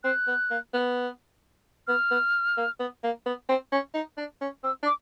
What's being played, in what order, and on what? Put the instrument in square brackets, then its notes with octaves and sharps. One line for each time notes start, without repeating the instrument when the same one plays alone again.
[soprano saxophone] C4 [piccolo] F#6
[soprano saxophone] B3
A#3
B3
[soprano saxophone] B3 [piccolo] F6
[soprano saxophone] B3
A#3
B3
A#3
B3
C4
C#4
D#4
D4
C#4
[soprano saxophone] C4 [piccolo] E6
[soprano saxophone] D4
[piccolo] D6